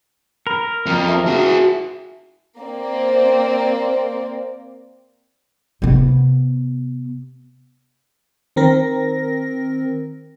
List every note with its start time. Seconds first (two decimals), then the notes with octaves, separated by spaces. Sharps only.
0.47 A#4 B5
0.86 F2
1.09 E5
1.27 F#4 G#4
2.59 A#3 C4 D5
5.82 C3 B3
8.56 D#3 C4 A#4 A#6